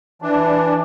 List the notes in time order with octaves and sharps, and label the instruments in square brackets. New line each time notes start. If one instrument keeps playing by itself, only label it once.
[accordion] E3 D4